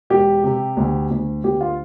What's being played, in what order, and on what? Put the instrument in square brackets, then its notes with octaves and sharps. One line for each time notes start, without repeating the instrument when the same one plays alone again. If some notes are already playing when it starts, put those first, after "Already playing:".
[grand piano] E1 G4
C3
D2
D2
D2 G4
F4